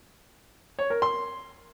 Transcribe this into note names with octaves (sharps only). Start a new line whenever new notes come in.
C#5
A#4
C6